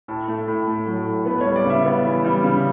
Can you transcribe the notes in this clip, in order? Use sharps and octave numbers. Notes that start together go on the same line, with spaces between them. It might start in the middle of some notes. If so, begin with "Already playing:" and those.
A2 A4
A3
A2
A3
F#3
A2
B3 B4
C#5
G3
D5
C#3 E5
B3
E3
G3
C#3